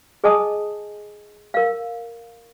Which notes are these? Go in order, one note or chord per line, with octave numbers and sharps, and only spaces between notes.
G#4 D#5 G#5 A5 D#6
A#4 F5